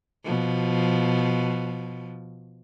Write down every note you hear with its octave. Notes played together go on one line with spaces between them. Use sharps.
B2 F3